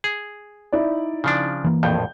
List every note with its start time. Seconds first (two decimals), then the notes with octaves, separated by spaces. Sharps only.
0.04 G#4
0.73 D#4 E4 D5
1.24 C#3 F3 D4
1.64 E3 A#3
1.83 A#1 F2 A2 G6